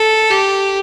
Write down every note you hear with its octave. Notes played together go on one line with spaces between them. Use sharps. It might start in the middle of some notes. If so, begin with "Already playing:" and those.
Already playing: A4
G4